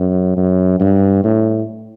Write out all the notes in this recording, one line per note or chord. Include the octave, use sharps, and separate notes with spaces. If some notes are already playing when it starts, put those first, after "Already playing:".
Already playing: F#2
F#2
G2
A2